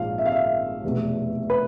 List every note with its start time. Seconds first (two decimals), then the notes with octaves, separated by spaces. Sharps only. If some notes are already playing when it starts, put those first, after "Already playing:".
Already playing: A#1 G#2 F3 F5
0.18 E5
0.26 F5
0.32 E5
0.84 F1 E2 B2
1.50 B4